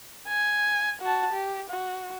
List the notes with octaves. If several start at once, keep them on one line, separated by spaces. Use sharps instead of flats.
G#5
F#4 A5
G4
F#4